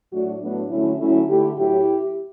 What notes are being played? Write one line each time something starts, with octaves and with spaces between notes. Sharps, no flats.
A2 F#3 A3 D4 F#4
A2 F#3 A3 B3 D4
D3 F#3 A3 C#4 E4
D3 F#3 A3 C#4 E4
D3 A3 E4 G4
A2 F#3 E4 G4